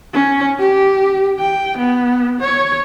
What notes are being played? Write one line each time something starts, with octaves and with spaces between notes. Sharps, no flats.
C#4
G4
G5
B3
C#5